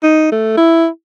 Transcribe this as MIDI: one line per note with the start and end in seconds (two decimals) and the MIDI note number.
0.03 0.31 63
0.32 0.55 57
0.57 0.87 64